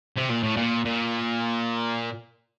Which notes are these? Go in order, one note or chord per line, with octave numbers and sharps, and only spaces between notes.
C3
A#2
A2
A#2
A#2